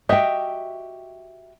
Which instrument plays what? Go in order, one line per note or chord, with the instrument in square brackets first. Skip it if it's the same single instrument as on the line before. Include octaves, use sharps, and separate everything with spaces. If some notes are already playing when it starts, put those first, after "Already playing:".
[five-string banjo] F#4 G4 D#5 [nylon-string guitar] E5 G5